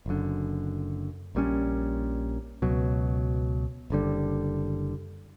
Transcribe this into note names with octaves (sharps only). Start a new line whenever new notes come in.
F#1 F#2 D3
A#1 A#2 G3 C#4
C#2 B2 F#3
F#1 E2 D3 G3